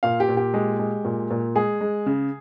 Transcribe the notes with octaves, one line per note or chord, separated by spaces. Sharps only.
A#2 F5
G4
A#2
G4
G#3
G#3
A#2
A#2
G#3 G#4
G#3
C#3